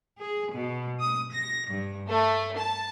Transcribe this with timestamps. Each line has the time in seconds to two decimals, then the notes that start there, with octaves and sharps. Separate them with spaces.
0.19 G#4
0.53 B2
1.00 D#6
1.31 A#6
1.69 G2
2.08 A3
2.58 A5